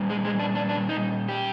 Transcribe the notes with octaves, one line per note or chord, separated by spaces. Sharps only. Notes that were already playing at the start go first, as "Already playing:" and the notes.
Already playing: A#2 G3
G#3
G#3
D4
D4
D4
D#4
G4